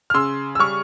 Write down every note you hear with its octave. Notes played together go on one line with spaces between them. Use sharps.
F6
C#3 C6 E6
E6
G3 C#6 F6